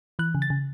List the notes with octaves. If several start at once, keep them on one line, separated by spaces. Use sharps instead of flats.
E3 F#6
C#3
A6
C#3